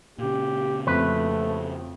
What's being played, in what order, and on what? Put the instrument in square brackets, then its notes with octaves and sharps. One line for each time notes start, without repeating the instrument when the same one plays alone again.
[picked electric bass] A#2 C#3 [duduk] G4
[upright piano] F2 [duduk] A3 [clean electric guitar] B4